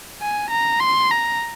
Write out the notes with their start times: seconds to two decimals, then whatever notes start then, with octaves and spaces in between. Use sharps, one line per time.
0.22 G#5
0.50 A#5
0.80 C6
1.11 A#5